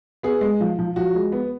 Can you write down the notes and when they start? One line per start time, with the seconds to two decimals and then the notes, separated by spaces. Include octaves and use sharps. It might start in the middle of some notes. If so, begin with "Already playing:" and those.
0.23 B3 G#4
0.41 G#3
0.60 F3
0.79 F3
0.96 F3 F#4
1.15 G#3
1.32 B3